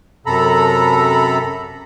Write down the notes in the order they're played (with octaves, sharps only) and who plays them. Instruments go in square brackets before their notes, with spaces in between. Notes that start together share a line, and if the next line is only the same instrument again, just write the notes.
[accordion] F#2 C3 A4 A#5 B5